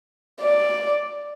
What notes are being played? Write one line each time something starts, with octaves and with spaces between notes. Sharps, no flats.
D5